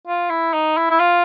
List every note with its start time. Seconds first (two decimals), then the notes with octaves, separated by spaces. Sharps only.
0.07 F4
0.30 E4
0.54 D#4
0.77 E4
0.91 E4
1.00 F4